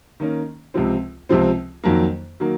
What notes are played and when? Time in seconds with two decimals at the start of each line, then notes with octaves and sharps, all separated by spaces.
0.20 D#3 A#3 C#4
0.74 C#2 C3 F3 C4
1.29 C#2 C3 F3 C4
1.84 F2 D#3 F#3 A#3
2.40 D#3 F#3 A#3